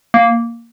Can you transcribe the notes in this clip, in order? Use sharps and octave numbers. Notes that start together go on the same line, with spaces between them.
A#3